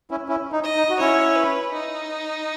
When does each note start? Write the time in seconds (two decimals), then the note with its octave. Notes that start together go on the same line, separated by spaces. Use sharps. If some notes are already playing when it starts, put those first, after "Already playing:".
0.11 C#4 E4
0.29 C#4 E4
0.52 D#4
0.64 D#5
0.76 D#4
0.90 F#4
1.00 C#4 E4 C#5
1.36 B4
1.72 D#4